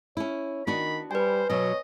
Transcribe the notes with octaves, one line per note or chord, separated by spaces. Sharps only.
C#4 E4 C#5
D#3 B3 D4 F#4 B5
G3 B4 C5 G#5
B2 F#3 C#5 D#5